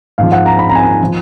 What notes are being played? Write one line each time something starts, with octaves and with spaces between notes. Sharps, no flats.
G#2 F3 F5
F#5
A#5
B5
A#5
G#5
A#5
F3